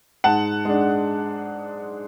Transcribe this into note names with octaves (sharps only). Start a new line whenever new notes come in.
G#2 F#5 A5
G#3 D4